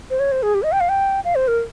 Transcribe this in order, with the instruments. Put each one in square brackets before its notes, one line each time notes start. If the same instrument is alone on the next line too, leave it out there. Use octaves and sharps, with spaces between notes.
[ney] C5
C#5
C5
G#4
G4
D#5
G5
F5
G5
F5
C5
A#4